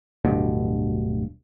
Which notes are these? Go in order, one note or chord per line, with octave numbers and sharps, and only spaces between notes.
D1 D2 G2 B2